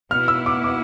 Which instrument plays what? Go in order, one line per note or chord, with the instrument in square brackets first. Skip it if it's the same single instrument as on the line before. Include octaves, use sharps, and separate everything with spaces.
[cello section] B2 B3 E4 [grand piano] F6
[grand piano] E6
D6
D6